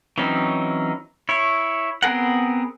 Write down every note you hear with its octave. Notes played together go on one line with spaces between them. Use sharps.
E3 F#3 C4 C#4 D#4
E4 C#5
B3 C4 G#4 A#4 F#5